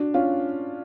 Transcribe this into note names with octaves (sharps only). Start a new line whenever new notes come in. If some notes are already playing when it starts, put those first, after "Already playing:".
Already playing: D4 F#4
C#4 F4